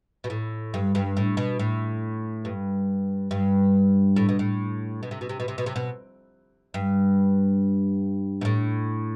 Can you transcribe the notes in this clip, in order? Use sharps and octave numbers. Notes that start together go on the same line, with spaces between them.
B2
A2
G2
G2
A2
B2
A2
G2
G2
A2
B2
A2
B2
C3
B2
C3
B2
C3
B2
C3
B2
G2
B2
A2